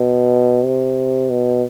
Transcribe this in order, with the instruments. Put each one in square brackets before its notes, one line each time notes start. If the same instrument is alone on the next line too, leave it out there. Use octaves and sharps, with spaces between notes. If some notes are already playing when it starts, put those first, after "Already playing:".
Already playing: [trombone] B2
C3
B2